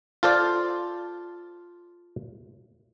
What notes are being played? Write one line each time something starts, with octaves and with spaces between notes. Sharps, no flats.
F4 A4 C5 D5